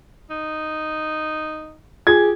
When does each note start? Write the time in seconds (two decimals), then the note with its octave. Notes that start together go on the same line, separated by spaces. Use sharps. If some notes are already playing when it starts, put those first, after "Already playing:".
0.30 D#4
2.07 F4 G4 G#4 G#6